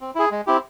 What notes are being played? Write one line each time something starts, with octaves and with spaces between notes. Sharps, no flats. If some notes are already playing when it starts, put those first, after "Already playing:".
C4
E4 G#4
G#3
C4 E4 G4